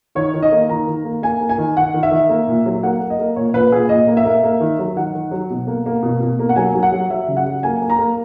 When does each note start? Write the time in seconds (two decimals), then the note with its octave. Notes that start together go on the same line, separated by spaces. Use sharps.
0.15 D#3 C#5
0.34 D#3
0.42 D#5
0.52 A#3
0.69 D#3 A#5
0.87 D#3
1.04 A#3
1.23 A#3 G#5
1.41 A#3
1.49 G#5
1.58 D#3
1.76 D#3 F#5
1.94 D#3
2.03 E5
2.11 D#3
2.29 A#3
2.47 A#2
2.66 F#3
2.83 A#3 F#5
3.01 A#3
3.10 D#5
3.19 A#3
3.36 A#2 C#5
3.54 A#2 B4
3.72 A#2 G#4
3.89 A#2 D#5
4.07 A#3
4.17 E5
4.25 A#3
4.44 A#3
4.60 D#3
4.79 F#3
4.96 D#3 F#5
5.15 D#3
5.31 F#3
5.50 B2
5.67 A#3
5.86 A#3
6.03 B2
6.20 B2
6.39 A#3
6.49 F#5
6.56 F#3 G#5
6.74 F#3
6.83 F#5
6.92 F#3
7.10 F#3 E5
7.28 C#3
7.37 F#5
7.46 F#3
7.63 A#3 G#5
7.82 A#3
7.90 A#5
7.98 A#3